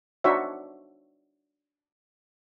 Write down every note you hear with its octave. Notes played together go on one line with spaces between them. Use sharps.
D4 D#4 F#4 C5 C#5 E5